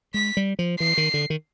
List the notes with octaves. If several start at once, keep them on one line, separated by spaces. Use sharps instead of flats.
G#3 B6
G3
F3
E3 C7
D#3
D3
D#3